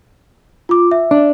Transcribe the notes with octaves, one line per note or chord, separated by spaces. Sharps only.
F4 D6
E5
D4